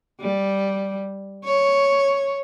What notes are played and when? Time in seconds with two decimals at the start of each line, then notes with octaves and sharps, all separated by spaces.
0.21 G3
1.45 C#5